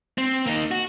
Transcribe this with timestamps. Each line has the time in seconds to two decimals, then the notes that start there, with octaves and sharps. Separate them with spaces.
0.18 C4
0.47 A#3 D#4
0.71 F#4